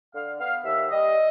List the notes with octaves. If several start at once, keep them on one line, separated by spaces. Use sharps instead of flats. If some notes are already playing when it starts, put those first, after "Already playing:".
D3 F5
B3 F5
D#2 E5
G3 D#5